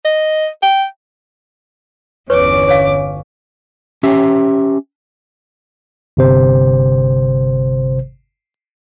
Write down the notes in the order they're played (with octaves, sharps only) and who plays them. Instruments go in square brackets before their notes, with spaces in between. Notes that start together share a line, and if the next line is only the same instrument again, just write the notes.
[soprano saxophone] D#5
G5
[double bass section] G1 D3 C#4 [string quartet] E2 D6 [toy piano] B4 C#5 C#6
[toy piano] C#5 F5
[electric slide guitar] C#4 G4 E5
[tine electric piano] G1 C3 C5